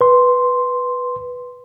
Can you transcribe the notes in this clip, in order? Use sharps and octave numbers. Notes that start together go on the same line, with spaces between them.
B4 C6